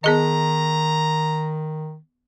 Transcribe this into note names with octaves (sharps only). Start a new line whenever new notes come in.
D#3 B3 G#4 D#5 A#5